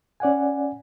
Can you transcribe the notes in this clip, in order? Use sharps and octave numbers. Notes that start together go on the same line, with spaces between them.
C#4 D5 F#5 G#5